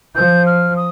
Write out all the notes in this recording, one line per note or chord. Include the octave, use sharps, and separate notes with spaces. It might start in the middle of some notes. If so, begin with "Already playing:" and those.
F3 G6
F6
D#6